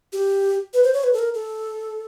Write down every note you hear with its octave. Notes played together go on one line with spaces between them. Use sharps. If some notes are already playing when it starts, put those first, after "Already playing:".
G4
B4
C5
C#5
B4
A4
A#4
A4